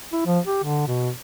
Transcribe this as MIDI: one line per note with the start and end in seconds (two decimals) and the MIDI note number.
0.12 0.21 64
0.26 0.40 53
0.46 0.61 67
0.64 0.86 50
0.87 1.10 47